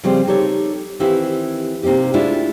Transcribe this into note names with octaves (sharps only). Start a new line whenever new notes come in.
C#3 F3 G3 C4
D#4 G4 A4 C#5
D#3 E3 C4 E4 G4 F5
C3 A#3 C4 D#4 G4
G#3 A3 D4 E4 F4